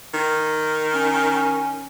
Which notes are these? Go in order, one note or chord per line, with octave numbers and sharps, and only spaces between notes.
D#3
C#4